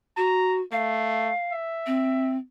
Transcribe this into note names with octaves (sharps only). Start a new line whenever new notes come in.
F#4 A#5
A3 F5
E5
C4